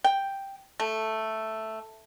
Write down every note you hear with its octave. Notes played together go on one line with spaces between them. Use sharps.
G5
A3